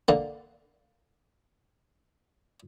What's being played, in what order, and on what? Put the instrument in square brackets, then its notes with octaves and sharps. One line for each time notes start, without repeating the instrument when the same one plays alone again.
[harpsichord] D3 A#3